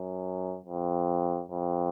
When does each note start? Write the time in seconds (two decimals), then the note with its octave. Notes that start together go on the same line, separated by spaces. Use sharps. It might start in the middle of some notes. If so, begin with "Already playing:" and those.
Already playing: F#2
0.65 F2
1.51 F2